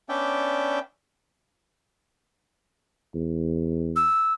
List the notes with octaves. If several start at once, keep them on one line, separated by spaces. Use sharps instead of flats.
B3 C#4 D4 D5 E5 G5
E2
E6